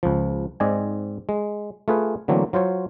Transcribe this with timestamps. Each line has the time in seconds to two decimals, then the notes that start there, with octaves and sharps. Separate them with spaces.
0.03 C#2 F3
0.60 G#2 C4 D5 D#5 G#5
1.29 G#3
1.88 A3 F4 G#4 B4
2.28 D3 E3 F#3 A3 A#3 C4
2.53 F#3 F4 C5 C#5